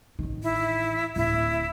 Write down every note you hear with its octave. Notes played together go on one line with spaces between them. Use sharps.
A1 D#3
E4
D1 E4